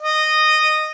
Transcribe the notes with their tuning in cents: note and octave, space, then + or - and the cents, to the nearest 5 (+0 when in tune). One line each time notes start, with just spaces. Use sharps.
D#5 -15